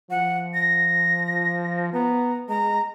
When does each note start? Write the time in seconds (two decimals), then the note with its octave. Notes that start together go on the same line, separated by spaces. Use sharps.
0.10 F3 F#5
0.54 A#6
1.93 B3 A#5
2.49 G#3 A#5